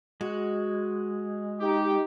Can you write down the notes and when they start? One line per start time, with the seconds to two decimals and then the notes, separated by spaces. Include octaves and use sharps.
0.21 G#3 F#4
1.61 D#4 G4